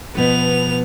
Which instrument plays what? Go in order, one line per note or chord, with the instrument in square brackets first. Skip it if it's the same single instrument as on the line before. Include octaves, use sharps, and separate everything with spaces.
[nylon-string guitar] B2 F3 B4 [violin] B3 F7